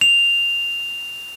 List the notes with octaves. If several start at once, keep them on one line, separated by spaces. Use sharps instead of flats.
F7